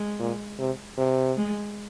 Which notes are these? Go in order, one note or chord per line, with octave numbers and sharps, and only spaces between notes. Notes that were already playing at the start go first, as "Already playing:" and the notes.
Already playing: G#3
A#2
C3
C3
G#3